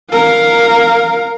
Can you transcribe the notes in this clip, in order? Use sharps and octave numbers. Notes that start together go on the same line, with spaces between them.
A#4 F5